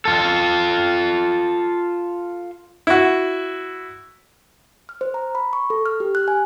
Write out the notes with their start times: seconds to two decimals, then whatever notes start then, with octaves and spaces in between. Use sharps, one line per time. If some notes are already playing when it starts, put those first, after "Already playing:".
0.05 F4 A4
2.87 E4 F#4
4.89 F6
5.01 C5
5.14 A#5
5.35 B5
5.53 C#6
5.70 A4
5.86 F6
6.00 G4
6.15 F#6
6.28 G#5